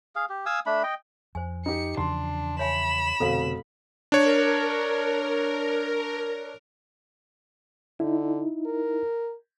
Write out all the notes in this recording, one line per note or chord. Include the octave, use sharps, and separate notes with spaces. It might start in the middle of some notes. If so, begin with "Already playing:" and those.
G#4 F5
G4
F5 G#5 D#6 E6
A3 D4 B5
D#5 G5
F2 C5 G#5
D#4 G4 C#7
E2 C#3 F3 D4 C6
C#5 E5 G#5 B5 E7
F1 B2 D3 B3 C4 A4 F5
D4 A#4 C#5
D3 D#4 E4
A#4